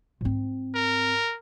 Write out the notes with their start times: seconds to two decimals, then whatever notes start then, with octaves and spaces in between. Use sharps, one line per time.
0.21 G#2 C4
0.75 A#4